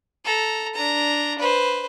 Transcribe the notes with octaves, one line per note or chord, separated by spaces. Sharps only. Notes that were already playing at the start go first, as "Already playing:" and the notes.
A4 A#5
D4 A#5
B4 C5